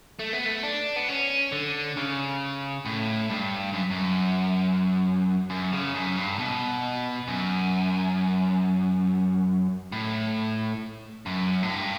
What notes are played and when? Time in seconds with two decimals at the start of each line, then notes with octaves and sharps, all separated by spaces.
0.19 A3
0.33 B3
0.46 A3
0.63 D4
0.96 B3
1.08 C#4
1.52 D3
1.97 C#3
2.85 A2
3.30 G2
3.73 F#2
3.91 F#2
5.50 F#2
5.73 C#3
5.94 F#2
6.17 G2
6.39 B2
7.28 F#2
9.92 A2
11.26 F#2
11.63 A2
11.70 G2